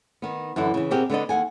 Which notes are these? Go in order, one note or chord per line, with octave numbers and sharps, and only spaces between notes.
D#3 B3
F#2 D3 E3 E4
C#3 E3
B2 C4 G4 G#4 A#4
D3 B3 D4 D#5
D#2 F3 F#5 G#5